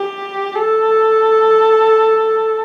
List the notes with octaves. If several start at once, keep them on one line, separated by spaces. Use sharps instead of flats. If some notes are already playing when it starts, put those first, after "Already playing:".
Already playing: G4
A4